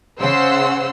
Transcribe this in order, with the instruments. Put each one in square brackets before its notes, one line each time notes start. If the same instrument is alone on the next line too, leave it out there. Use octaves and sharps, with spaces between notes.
[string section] C#3 C5 F#5 C6 E6